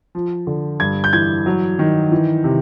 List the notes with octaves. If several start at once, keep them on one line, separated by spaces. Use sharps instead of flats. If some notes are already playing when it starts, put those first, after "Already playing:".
F3
D3
G2 G#6
G6
E3 G#6
F#3
D#3
E3
C3